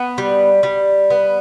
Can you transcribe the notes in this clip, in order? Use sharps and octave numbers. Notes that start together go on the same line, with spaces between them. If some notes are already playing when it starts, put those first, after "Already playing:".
Already playing: B3
G3
G3
B3